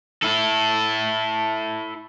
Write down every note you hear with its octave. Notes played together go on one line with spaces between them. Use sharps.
E4 A4